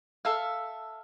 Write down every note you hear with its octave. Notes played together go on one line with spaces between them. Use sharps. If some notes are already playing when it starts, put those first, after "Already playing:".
A4 E5 F5